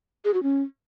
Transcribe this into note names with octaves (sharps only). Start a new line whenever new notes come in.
G#4
F#4
C#4